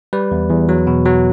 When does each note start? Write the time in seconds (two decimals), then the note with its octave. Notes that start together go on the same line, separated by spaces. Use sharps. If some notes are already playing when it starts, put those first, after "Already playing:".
0.13 G3 B4
0.31 E2
0.50 E2
0.69 F#3
0.87 B2
1.06 F#3